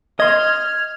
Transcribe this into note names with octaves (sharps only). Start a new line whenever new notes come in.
D#5 C6 F6 G#6